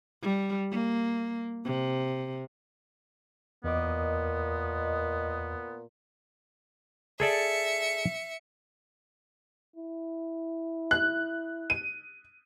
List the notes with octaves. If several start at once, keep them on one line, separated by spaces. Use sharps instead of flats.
G3
A#3
C3
E2 A#2 B3 A#4 D#5 D6
G#4 A4 D5 E5 C#7
E4
F#6
D#7